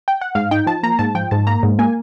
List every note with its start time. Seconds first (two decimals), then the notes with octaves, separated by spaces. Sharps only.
0.08 G5
0.21 F#5
0.35 G#2 F5
0.51 D#4 G5
0.67 F3 A5
0.83 A#3 A#5
0.99 G#2 A5
1.15 F3 G5
1.31 G#2 A5
1.47 A#3 A#5
1.63 G#2
1.79 A#3 G#5